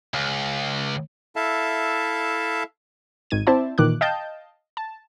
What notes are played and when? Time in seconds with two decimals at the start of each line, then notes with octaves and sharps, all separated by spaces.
0.14 C#2
1.36 E4 A4 E5 F5 A5
3.31 G#1 D#3 G#6 D#7
3.47 C4 E4 C5 D5 E5 A5
3.78 A#2 D#3 E3 D6 F#6
4.01 D#5 F5 G5 A5 G6
4.77 A5